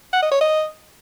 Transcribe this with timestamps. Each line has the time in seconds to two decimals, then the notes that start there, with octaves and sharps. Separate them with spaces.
0.13 F#5
0.22 D#5
0.32 C#5
0.41 D#5